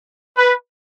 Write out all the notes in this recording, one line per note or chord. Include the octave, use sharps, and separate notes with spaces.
B4